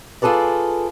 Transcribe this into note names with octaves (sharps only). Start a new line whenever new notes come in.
F4 G#4 A4 B4 D5